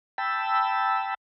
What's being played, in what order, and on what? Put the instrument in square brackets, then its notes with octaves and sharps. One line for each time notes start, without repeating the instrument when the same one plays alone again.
[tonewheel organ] G5 A5 B5 E6